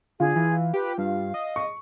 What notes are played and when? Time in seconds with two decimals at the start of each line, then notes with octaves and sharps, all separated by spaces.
0.20 D3 F4 G#4
0.36 E3
0.74 G4 B4
0.98 G2 F5
1.34 D#5
1.56 C#6